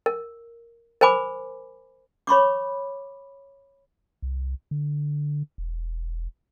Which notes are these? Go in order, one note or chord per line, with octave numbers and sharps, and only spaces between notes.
A#4
A#4 C5 G#5 B5 D6
C#5 B5 C#6 D6
C2
D3
E1